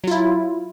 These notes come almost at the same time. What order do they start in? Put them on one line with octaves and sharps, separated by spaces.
F#3 F4 E4